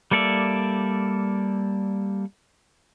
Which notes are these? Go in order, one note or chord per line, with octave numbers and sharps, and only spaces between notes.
G3 A#3 A4 D5 E5